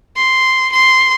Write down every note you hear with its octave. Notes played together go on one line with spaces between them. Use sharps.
C6
C6